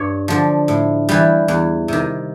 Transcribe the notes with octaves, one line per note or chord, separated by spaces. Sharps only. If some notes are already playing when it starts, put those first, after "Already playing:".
Already playing: G2 C#5
D3 F3
A2
E3 G3
E2
C3 D#3